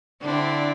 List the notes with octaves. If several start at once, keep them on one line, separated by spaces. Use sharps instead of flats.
D3 C4 D4 E4